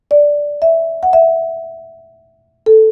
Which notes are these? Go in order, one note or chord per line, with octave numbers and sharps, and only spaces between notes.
D5
E5
F#5
E5
A4